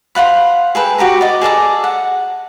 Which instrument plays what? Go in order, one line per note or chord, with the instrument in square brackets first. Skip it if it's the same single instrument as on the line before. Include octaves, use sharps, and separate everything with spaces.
[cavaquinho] C5 F5 F#5 B5
G#4 A4 B4 G5
F#4 G4 B4 A#5
D5 D#5
G#4 A4 D5 A#5
F#5